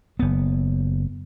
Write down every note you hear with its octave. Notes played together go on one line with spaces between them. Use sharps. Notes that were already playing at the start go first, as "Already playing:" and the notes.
F#1 B3